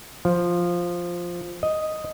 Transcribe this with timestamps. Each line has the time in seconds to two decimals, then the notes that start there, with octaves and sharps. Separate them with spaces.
0.25 F3
1.63 D#5